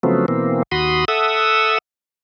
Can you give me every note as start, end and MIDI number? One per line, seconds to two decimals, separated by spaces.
0.03 0.26 49
0.03 0.26 53
0.03 0.26 54
0.03 0.26 57
0.03 0.26 59
0.03 0.26 60
0.28 0.63 47
0.28 0.63 52
0.28 0.63 58
0.28 0.63 60
0.72 1.05 39
0.72 1.05 66
0.72 1.05 83
0.72 1.05 84
0.72 1.05 87
1.08 1.78 69
1.08 1.78 76
1.08 1.78 78
1.08 1.78 87
1.08 1.78 88